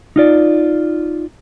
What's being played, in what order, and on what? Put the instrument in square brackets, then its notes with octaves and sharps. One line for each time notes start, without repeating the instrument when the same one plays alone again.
[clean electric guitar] D#4 F4 D5